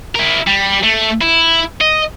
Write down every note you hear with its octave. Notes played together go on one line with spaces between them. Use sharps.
E4 A#4
G3
A3
E4
D#5